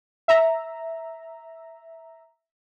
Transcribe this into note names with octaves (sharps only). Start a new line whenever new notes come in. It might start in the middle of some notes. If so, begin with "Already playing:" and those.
E5 A#5